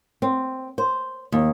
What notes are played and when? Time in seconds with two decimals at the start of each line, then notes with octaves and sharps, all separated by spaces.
0.22 C4
0.78 C5
1.32 D#2